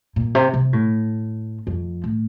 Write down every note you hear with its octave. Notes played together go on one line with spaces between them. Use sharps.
A#2
C3
C3
A2
F2
A2